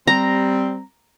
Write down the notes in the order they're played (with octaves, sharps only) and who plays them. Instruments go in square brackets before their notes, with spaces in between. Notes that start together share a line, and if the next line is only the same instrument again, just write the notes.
[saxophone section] G3 C4 [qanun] A#5